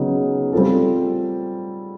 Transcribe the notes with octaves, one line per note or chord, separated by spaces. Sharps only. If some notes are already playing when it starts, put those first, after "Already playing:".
Already playing: C#3 F#3 B3 D#4 G#4
G3 C4 F4 A4